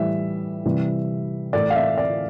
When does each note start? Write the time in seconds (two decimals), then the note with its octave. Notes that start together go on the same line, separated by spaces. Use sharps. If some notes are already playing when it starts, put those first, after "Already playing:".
Already playing: A2 E3 G3 E5
0.65 C3 E3 G3
1.53 A2 E3 A3 D5
1.70 F5
1.76 E5
1.98 D5